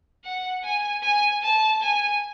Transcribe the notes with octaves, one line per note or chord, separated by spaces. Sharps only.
F#5
G#5
G#5
A5
G#5